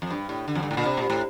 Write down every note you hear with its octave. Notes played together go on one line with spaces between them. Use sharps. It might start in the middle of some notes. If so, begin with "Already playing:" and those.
F2
G2
A2
D3
F2
G2
A2
A#2
C3
A#2
A2